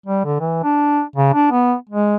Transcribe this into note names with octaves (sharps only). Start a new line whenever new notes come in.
G3
D3
E3
D4
C#3
D4
B3
G#3